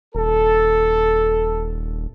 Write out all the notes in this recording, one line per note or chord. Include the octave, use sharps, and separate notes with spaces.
D#1 A4